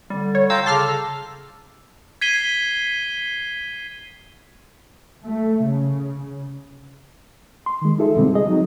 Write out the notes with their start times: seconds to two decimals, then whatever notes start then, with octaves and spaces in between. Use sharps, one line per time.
0.10 D3 G3
0.35 C#5
0.50 F4 F5 G5 A#5 E6
0.66 C#3 A4 A5 C6 D6 F6
2.21 G#6 B6 C7 D#7 G7
5.24 A3
5.64 C#3
7.66 C6
7.82 D#3 G#3
7.98 D#4 F4 G#4 A4 E5
8.15 F2 B2 D3 G3 G#3 C4
8.34 G#4 D#5
8.47 F#3 C4 D#4